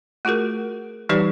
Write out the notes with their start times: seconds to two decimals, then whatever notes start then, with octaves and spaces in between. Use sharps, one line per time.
0.25 A3 F4 F#4 G#4 A#4
1.09 E3 G3 D#4 G4 B4 D5